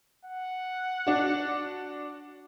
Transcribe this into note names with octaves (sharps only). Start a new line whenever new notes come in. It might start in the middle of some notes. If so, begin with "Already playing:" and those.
F#5
D4 F#4